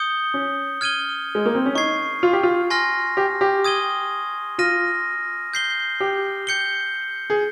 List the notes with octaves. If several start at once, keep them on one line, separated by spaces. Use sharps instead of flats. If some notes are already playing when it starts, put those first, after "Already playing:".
Already playing: D#6 G6 C#7 G7
C#4
F6 G#6 D#7 G7
G#3
A#3
C4
C#4
D#4 C#6 G#6 C7
F4
G4
F4
G#5 C6 F6 A#6
G4
G4
D#6 G#6 D#7 G7
F4 F6 A#6 D#7
G6 C7 G7
G4
G6 C#7 G7
G#4